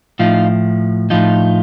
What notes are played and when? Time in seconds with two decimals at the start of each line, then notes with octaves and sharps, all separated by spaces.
0.19 A2 F3 D#4 F4
1.10 A2 F3 D#4 F4